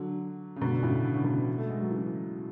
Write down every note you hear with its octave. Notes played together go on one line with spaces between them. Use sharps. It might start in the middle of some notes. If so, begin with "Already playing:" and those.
Already playing: D3 F#3
C#3
B2 D3
D3
A2 C#3
D3
C#3
B2 D3
A3
G#3
F#3
C#3 E3